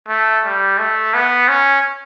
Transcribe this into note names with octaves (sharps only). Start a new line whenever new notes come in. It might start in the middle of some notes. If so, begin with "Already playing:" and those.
A3
G3
A3
B3
C#4